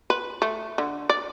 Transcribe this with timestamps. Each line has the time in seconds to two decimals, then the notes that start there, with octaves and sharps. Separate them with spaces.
0.10 B4
0.42 A3
0.78 D3
1.09 D5